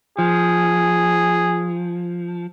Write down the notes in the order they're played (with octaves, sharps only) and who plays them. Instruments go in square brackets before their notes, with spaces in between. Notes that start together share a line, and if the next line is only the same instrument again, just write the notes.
[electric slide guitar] F3 [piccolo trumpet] G#4